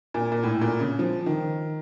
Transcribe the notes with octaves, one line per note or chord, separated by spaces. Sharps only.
A#2
A#2
A2
A#2
C#3
F3
D#3